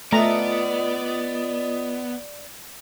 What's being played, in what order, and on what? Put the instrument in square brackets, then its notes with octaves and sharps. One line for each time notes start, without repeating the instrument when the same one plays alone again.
[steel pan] A3 A#5 [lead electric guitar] B3 [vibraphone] F4 D#5 D#6 [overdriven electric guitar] D5